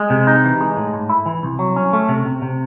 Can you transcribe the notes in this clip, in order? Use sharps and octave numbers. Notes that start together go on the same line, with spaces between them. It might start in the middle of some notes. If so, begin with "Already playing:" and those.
Already playing: G#3
C3
D#4
E3
G#3
A2
G#2
E4
E3
C2
F#3
C#4
A3
C3
C3
C3